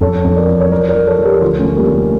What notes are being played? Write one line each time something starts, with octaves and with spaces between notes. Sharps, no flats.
F2 A4 C#5
F2
A#4 D5
E3
C#5
F3 A#4 D5
A#4 D5
F3
A4 C#5
F3
G4 A#4
D2 F4 A4
A3 C#4
D2
G3 A#3
D2
A3